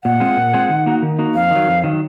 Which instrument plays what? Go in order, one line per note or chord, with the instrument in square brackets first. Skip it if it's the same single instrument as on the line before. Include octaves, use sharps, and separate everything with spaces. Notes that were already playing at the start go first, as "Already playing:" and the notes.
[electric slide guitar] A#2 [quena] F#5
[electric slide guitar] G#3 C4 F4 G#4
A#2
G#3 C4 F4 G#4
D#3
A#3 D#4 F#4
D#3
A#3 D#4 F#4
[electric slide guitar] F2 [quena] F5
[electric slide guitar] D#3 F#3
F2
D#3 F#3